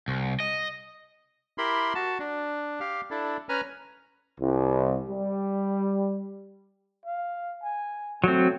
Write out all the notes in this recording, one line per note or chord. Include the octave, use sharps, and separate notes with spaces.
C2
D#5
E4 G4 A#4 B5 C6
F#4 A5
D4
G4 F5
D4 E4 A4
C#4 B4 G#5 A#5 F6
C2
G3
F5
G#5
F#3 A3 C4